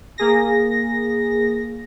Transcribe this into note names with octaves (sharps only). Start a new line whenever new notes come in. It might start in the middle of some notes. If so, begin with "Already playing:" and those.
A#3 G#4 A#6